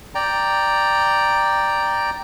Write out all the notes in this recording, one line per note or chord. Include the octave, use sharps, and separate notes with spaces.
D5 G5 A#5